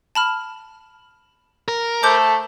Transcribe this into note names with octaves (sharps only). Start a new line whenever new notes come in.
A5 B5 F6
A#4
A3 A4 C5 D6 G6